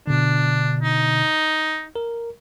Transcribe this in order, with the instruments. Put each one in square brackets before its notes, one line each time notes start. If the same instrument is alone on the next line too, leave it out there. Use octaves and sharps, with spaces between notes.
[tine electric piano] B2 D3 [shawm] D4
[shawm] D#4
[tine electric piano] A#4